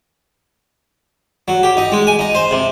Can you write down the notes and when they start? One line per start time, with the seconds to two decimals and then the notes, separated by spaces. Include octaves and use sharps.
1.48 F#3
1.63 G4
1.77 D#4
1.92 G#3
2.07 G#5
2.19 D#4
2.35 C5
2.51 C3